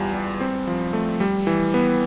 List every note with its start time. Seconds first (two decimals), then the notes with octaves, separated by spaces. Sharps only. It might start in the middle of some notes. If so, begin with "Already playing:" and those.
Already playing: E2 G3 F4
0.14 G3
0.41 C4
0.67 F3
0.93 A3
1.20 G3
1.47 E3
1.74 B3